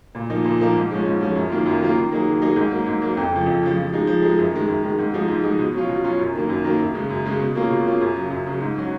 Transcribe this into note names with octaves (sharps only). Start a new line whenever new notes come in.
A#2
F3 A#3 D#4
A#2
F3 A#3 D#4
G#2
F3 G#3 C#4
G#2
F3 G#3 C#4
F#2
D#3 F#3 A#3 F4
F#2
D#3 F#3 A#3 F4
D#3
F#3 A#3 D#4 G#4
D#3
F#3 A#3 D#4 G#4
G#2
F#3 A#3
G#2
F#3 A#3
F2
C#3 F3
F2
C#3 F3
F3
G#3 D#4 G#4
F3
G#3 D#4 G#4
F#2
D#3 G#3
F#2
D#3 G#3
G#2
F3 G#3 D#4 G#4
G#2
F3 G#3 D#4 G#4
B2
F#3 C#4 F4
B2
F#3 C#4 F4
F#2
D#3 F#3 A#3
F#2
D#3 F#3 A#3
F#2
C#3 G#3
F#2
C#3 G#3
B2
A#3 C#4 F4 G#4
B2
A#3 C#4 F4 G#4
F#2
C#3 F#3
F#2
C#3 F#3
G#2
F#3 C#4 F#4